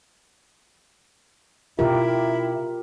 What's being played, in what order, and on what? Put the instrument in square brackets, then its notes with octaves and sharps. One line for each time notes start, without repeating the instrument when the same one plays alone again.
[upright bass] B2 C#4 [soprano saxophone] E4 [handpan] F4 G4 A#4